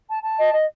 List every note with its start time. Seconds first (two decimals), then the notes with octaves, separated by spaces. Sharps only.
0.09 A5
0.23 A5
0.38 D#5
0.52 D#5